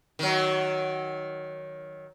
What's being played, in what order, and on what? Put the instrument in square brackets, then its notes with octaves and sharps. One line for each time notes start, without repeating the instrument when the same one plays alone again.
[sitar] D#3 F#3